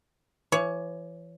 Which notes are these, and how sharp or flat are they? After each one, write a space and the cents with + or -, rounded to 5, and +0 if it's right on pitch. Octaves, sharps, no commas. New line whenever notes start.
E3 +35 C#5 +15